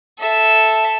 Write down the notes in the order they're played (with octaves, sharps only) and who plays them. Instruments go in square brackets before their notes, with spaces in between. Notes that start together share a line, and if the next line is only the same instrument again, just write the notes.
[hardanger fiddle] A4 E5